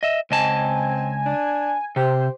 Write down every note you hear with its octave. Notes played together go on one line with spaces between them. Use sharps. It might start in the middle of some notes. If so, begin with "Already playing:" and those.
D#5 E5
C#2 C4 D#5 G#5 A5
D4
C3 G4 C5